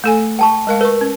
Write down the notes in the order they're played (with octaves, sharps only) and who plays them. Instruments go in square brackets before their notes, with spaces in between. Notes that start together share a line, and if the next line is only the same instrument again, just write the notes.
[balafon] A3 A4 G#5
[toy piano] G5 A5 C#6
[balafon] G#3 A#4 F5
[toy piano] A#4 [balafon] B4 C#6
[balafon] C#4